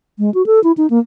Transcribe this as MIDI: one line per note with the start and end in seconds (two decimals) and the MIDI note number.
0.19 0.32 56
0.34 0.45 66
0.46 0.62 69
0.64 0.72 64
0.77 0.89 63
0.90 0.99 58